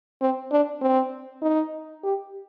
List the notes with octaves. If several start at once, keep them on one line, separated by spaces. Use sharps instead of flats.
C4
D4
C4
D#4
G4